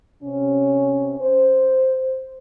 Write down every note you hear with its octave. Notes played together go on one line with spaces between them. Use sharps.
C3 C#4
C5